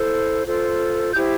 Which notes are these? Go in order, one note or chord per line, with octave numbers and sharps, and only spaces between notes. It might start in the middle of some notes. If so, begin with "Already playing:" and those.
Already playing: E4 A4 C5
F4 A4 C5
E4 G4 C5 E6 G6